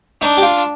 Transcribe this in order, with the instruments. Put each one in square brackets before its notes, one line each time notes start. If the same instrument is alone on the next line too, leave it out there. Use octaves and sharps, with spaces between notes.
[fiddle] D4 [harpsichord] D#4
[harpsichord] G4
F4